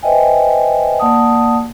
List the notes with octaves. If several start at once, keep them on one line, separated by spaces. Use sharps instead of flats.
B4 C5 D#5 E5 G5 G#5
A#3 D5 F#5 A5 D#6